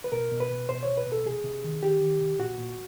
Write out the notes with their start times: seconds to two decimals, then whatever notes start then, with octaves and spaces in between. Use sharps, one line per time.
0.04 B4
0.12 B2 A#4
0.32 B2
0.40 B4
0.51 B2
0.69 B2 C5
0.83 C#5
0.89 B2
0.97 B4
1.06 B2
1.12 A4
1.26 C3 G#4
1.44 C3
1.64 D#3
1.83 D#3 G4
2.01 D#3
2.20 C3
2.39 A#2 F#4
2.58 A#2